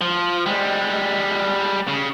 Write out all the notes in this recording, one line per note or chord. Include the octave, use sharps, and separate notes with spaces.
F3
G3 G#3
C#3